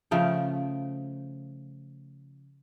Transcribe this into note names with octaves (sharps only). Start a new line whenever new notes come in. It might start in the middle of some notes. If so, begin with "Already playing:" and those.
C#3 F3 A3 G5